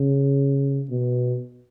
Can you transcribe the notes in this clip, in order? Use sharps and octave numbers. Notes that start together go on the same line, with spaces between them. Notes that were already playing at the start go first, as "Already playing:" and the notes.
Already playing: C#3
B2